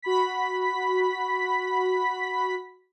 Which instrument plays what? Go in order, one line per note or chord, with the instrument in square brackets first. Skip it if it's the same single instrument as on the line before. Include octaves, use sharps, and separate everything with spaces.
[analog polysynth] F#4 B5 B6